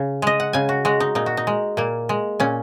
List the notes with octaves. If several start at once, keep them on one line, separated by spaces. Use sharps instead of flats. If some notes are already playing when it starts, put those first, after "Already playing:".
Already playing: C#3
G#3 D#5
F#5
C#3 G#5
F#4
G#3 F#4
D#4
A#2 D#4
F#4
D#4
G#3
A#2 A#3
G#3
A#2 C#4